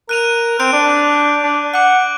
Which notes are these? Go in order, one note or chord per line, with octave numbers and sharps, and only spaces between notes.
A#4 F#6 D#7 F7
C4 G6 D7 F7
D4
D4
F#5 D6 F#6